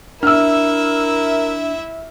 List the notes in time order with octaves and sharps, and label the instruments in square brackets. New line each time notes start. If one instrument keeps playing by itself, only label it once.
[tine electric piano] D4 [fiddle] E4 E5 [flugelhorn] A#4 [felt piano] E6 F6